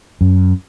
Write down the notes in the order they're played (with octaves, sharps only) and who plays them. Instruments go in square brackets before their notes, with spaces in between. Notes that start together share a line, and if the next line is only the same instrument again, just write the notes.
[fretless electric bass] F#2